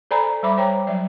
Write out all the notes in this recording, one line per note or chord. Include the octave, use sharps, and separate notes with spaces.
A4 C5 D5 G#5 A#5 B5
G3 C5 B5 D6
C5 C#5 G5 A#5
F#3 D5